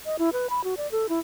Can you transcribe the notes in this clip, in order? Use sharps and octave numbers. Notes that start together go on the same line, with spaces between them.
D#5
E4
B4
B5
F#4
D5
A4
E4